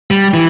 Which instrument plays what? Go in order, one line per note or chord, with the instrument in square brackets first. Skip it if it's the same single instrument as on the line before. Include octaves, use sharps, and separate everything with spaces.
[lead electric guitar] G3
E3